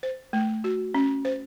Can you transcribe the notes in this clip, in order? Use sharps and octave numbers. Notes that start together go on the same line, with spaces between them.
C5
A3
F#4
C#4
C5